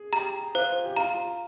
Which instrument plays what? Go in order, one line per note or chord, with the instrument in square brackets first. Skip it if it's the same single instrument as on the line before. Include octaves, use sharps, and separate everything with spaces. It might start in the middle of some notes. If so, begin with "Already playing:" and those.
Already playing: [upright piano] G#4
[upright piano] G4 [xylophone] A#5
[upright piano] F4 [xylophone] C5
[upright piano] G4
[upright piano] F4 [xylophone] A#5